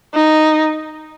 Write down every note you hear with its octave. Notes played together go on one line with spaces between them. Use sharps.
D#4